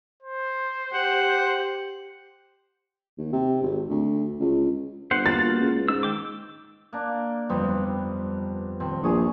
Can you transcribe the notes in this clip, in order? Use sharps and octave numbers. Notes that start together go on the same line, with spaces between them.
C5
G4 F#5
D#2
C3
G#1
D2
C#2
G1 C5 F#5
A#3 F4 F#4 A6
C#2
G#2 E6
D#3 G5 D6
A#3 D4
G1 F2 G3 B3 C4
D#1 C4
A#1 G2 G#4 C#6 D#6